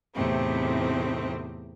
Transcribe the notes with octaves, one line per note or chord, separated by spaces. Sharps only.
E2 A2 C3 A3 C4 D#4